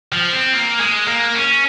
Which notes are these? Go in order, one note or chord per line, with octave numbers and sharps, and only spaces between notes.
F3
C4
A#3
G#3
A#3
C#4